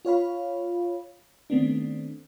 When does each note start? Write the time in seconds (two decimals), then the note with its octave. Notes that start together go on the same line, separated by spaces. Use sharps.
0.05 F4 C#5 F5 B5
1.50 D#3 A3 B3 C4 D4